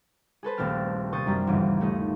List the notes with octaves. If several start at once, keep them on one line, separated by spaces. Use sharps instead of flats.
G#4 A4 B4 C5
D#1 A#1 A3 C4 F6 A6
C3 C5 C#6 D#6 A6
F#2 G3 D4 A#5
G1 D#2 C#3 E3
A3 D#4 D#5